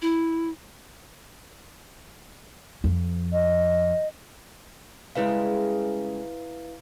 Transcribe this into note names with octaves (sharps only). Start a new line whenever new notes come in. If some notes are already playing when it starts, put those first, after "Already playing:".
E4
F2
D#5
C#3 G3 G#3 E4 B4 F5